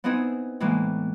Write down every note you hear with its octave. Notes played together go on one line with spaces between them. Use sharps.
B3 C4 D#4 E4 G#4
A2 E3 G#3 A#3